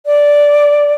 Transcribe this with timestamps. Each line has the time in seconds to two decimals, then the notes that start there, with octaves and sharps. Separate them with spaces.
0.06 D5